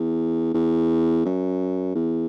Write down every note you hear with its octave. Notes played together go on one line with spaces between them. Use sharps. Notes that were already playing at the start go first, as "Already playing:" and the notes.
Already playing: E2
E2
F#2
E2